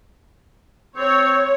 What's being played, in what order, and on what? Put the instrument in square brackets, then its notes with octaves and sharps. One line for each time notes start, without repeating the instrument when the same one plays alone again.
[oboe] C4 [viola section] C#5